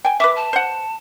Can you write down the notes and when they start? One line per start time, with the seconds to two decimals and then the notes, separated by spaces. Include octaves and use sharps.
0.05 G5 G#5
0.20 B4 E5 D6
0.36 A5
0.53 C5 F#5